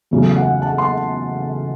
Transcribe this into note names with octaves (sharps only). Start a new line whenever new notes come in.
E2 C#3 F#3 A3
F#5
A5
C6